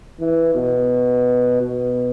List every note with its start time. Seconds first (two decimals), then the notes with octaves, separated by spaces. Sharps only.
0.20 E3
0.55 B2
1.61 B2